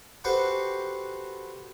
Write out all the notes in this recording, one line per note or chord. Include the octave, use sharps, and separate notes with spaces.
F#4 G4 A4 B4 C5